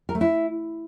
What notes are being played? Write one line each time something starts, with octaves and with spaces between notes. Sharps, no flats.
A#4
A3
E4